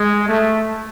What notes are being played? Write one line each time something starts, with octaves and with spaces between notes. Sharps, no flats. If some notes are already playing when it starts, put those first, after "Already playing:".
Already playing: G#3
A3